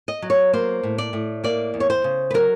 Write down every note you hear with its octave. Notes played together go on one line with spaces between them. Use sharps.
D#5
F#3
C#5
A#3 C5
A2
D5
A2
A#3 D5
E2
C#5
C5
C#3
B4
F#3 A#4